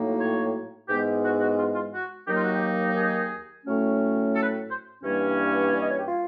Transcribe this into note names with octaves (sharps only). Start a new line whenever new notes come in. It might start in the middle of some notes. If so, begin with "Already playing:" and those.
Already playing: A2 F#3 A#3 D#4
C#5
G#2 E3 G#3 B3 G4
F#4
F#4
F4
F4
F#4
D#2 D#3 F#3 A#3 D#4 G4
F4
F#4
G4
G#4
A2 F#3 A3 C#4
A4
B4
C5
G2 E3 G3 A#3 C#4
D5
D#5
C#5
G4
F4